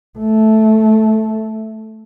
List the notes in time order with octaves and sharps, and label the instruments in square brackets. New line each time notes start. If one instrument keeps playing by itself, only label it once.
[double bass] A3